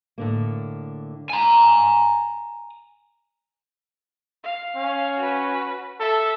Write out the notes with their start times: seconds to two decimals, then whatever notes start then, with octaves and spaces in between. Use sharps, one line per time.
0.18 A2 D3 A#3
1.30 G#5 A#5
4.43 F5
4.76 C#4
5.17 F#4 B4
6.00 A4 E5